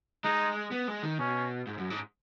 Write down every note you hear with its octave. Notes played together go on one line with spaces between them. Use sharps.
G#3 D#4
B3
G#3
D#3
B2 C#4
G#2
F#2
G#2